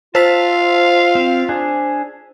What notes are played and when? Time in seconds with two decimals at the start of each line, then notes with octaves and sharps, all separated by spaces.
0.15 F4 C5 F5 A5 E6 B6
1.15 C4
1.49 D4 G#4